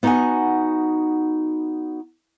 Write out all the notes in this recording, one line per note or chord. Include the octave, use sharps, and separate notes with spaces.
B3 D#4 F#4 F5 F#5 G#5